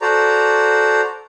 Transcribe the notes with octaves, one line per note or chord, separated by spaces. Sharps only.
F#4 A4 C5 D5 A#5